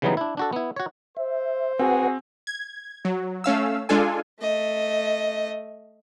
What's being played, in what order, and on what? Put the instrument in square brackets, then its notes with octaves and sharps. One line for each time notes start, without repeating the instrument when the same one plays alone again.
[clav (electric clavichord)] C#3 E3 F#3 G3 B3 D#4
D4 E4
D4 F#4 A4
B3 E4
F#4 C#5
[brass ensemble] C5 [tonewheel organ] E5
[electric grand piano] C4 [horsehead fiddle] F#4 G#4 [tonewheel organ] B4 F#5
[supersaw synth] G#6
F#3
A3 C#4 F5 E6
G#3 D4 F4 A4 G#5
[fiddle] A3 D#5